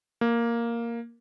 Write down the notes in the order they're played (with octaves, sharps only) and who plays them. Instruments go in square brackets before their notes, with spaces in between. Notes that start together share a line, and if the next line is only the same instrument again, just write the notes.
[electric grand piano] A#3